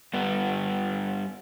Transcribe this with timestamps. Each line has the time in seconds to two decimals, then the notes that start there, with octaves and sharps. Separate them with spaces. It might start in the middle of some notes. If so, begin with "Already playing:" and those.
0.14 G2 B3